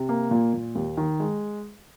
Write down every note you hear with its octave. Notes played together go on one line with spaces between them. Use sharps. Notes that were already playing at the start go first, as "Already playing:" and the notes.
Already playing: C3
A#3
A#2
A#2
D#2
D#3
G#3